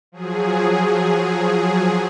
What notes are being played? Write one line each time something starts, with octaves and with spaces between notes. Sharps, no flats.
F3 F#3 G#4